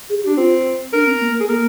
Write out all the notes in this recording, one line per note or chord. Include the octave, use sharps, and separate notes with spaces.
G#4
G4
D4
C4 F4
D4 A#4
C4
A#3
G#4
A#3 A#4